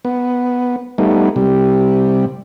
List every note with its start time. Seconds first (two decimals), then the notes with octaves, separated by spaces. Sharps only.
0.05 B3
0.98 G3 A3 B3 D#4
1.36 C3 G3